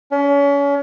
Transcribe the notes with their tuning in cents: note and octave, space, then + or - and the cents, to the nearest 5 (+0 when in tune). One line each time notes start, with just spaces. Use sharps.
C#4 +35